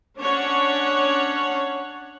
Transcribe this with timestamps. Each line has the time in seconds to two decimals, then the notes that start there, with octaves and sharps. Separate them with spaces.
0.17 C#4 D4 C#5 F#5